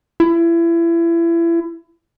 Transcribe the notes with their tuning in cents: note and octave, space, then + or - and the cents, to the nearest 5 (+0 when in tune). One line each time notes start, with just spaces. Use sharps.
E4 +30